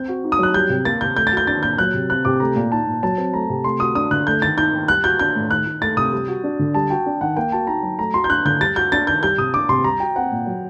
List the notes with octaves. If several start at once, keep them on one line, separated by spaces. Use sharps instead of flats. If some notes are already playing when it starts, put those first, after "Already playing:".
Already playing: C4 G6
F#4
D#4
D#6
F#3 F#6
G3 G6
C3
A#3 A6
C3 G6
A3 G6
A6
F#4
G6
D4 A6
A#2 G6
F#3 F#6
C3
C4 F#6
C3 D6
A3 A#5
A#2
D#4 A5
A#2
F#3 A5
C4
A3 A#5
C3
A3 C6
F#4 D#6
D4 D#6
D3 F#6
A3 G6
D#3 A6
D#4 G6
D#3
G3 F#6
F#4 G6
D4 G6
A2
D#3 F#6
D#4
A3 A6
C3 D#6
G3
F#4
D4
D3
G3 A5
F#4 G5
D4
D#3 F#5
A#3 G5
F#4 A5
D#4 A#5
F#3
A3 A#5
F#4 C6
G6
D4 F#6
D3 G6
G3 A6
F#4 G6
D4 A6
D#3 G6
G3 G6
C3 D#6
D4 D6
C3 C6
G3 A#5
F#4 G5
C4 F#5
A#2
F#3